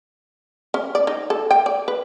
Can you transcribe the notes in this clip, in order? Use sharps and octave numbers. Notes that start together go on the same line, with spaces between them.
C#4
D5
D#4
A4
G5
D5
B4